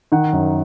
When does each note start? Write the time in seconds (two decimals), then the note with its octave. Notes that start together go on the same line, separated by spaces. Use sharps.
0.12 D#3 F#5
0.33 F#2